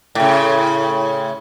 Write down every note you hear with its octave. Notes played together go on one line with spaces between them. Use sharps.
A2 C#3